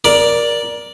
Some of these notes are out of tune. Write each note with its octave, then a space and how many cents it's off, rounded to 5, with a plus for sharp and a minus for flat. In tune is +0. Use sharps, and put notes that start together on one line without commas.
A#4 +20 D5 +0